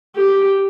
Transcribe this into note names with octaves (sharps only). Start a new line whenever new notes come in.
G4